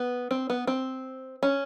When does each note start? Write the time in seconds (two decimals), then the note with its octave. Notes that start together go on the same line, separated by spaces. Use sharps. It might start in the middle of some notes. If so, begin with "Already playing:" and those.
Already playing: B3
0.31 C4
0.50 B3
0.67 C4
1.43 C#4